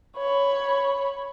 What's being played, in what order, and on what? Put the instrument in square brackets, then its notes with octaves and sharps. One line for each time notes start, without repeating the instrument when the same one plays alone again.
[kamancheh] C#5 B5